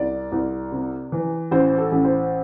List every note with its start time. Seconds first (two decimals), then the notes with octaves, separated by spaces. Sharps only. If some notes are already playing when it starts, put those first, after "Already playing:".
Already playing: C2 D5
0.32 C2
0.72 C3
1.12 E3
1.51 A1 C5
1.78 A4
1.92 A1
2.05 C5